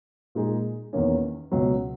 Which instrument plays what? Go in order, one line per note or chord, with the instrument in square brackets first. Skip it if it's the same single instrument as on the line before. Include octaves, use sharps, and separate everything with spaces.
[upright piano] A#2 G#3 D#4 G#4
E2 D#3 A#3 C#4
C#2 B2 F#3